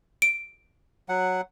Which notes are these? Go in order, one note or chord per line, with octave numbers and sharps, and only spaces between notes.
D7
F#3 F#5